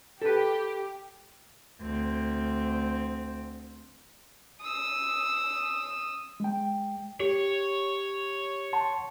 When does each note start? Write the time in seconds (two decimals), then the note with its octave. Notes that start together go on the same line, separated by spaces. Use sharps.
0.22 G4 A4 B4
1.81 D2 C4
4.61 D#6 E6
6.40 G#3 G5
7.20 G4 C#5
8.73 F#5 A5 C6